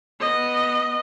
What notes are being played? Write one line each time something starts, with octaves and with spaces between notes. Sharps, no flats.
B3 D#5